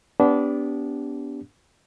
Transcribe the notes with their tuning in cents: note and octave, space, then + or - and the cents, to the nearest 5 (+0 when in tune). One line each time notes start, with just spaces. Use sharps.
B3 +5 D4 -25 G4 +0